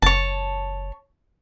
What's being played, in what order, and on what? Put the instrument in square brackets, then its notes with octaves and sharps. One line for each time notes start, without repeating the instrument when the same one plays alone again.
[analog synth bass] F#1 [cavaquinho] C#5 A5